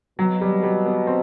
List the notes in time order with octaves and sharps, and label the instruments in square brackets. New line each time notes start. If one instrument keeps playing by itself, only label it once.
[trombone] B2 [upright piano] F#3
[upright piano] G3
G3
B3
C4